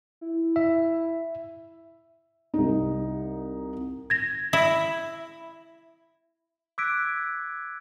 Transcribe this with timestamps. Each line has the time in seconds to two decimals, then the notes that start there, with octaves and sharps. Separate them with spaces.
0.21 E4
0.56 E5
2.54 C2 D#4
4.10 G#6 A#6
4.53 E4
6.78 D6 E6 F#6 G#6 B6 D7